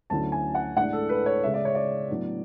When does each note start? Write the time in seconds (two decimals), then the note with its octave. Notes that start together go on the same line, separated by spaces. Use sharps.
0.10 D2 D3 F#3 C#4 E4 A5
0.32 G#5
0.55 F#5
0.76 A2 G#3 D4 F#5
0.93 A4
1.09 B4
1.26 C#5
1.43 C#3 G#3 C#4 E5
1.54 D5
1.65 C#5
1.75 D5
2.10 A2 F#3 B3 D4